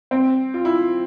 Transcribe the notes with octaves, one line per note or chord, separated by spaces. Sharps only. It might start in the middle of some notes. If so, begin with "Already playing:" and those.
C4
F4
E4